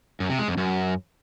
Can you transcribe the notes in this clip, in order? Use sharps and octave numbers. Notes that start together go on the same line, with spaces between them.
F#2
C3
G#3
F2
F#2